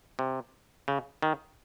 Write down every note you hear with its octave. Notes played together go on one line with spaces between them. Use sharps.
C3
C#3
D#3